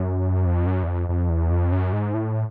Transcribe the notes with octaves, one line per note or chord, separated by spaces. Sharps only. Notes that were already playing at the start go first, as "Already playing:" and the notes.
Already playing: F#2
F2
F#2
E2
F2
F2
E2
F2
F#2
G#2
A2